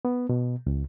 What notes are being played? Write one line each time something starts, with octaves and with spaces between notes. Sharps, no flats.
B3
B2
C#2